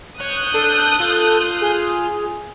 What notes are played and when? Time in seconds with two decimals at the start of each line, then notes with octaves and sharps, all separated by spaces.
0.21 C#5 D#6 F#6 G6
0.54 D4 A4
1.00 F4
1.61 G#4